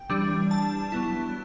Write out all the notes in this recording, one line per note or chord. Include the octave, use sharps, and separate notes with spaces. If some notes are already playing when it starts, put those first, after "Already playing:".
Already playing: G5
E3 G3 D4
A5
F#3 B3 E4